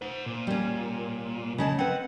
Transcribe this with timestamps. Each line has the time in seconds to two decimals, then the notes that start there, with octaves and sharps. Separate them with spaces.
0.02 C5 F#5
0.26 A#2
0.47 G3 C#4
1.58 C#3 G#3 A5
1.79 C4 B4 F#5